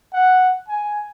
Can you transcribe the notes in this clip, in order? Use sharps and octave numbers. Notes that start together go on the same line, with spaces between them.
F#5
G#5